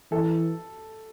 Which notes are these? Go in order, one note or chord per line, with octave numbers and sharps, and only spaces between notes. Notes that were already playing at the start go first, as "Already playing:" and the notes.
E3 A4